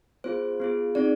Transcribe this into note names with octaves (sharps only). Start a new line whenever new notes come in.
B3 F4 G#4 C5
B3 F4 G#4
C4 D#4 G#4 D5